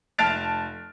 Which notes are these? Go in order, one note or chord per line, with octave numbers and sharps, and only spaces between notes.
F1 A5 F6 A6 D7 F7